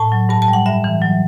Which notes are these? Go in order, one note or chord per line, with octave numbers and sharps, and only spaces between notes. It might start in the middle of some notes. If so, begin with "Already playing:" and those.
Already playing: A2 A5
F#3
G2 A5
A5
G3
F#5
G2 E5
E3
F#3